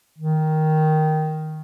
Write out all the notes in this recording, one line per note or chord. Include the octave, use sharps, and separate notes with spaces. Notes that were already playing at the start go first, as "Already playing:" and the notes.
D#3